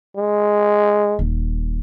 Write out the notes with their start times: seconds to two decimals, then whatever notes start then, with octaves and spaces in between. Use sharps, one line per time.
0.17 G#3
1.19 D#1